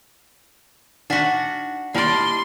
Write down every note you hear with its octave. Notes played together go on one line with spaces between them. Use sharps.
D4 D#4 F#4 F#5 B6
G3 A#3 E4 D5 A5 C6